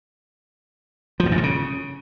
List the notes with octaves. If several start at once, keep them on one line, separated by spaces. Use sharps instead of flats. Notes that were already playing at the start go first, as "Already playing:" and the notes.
F3
G#2
F#2
C3
C#3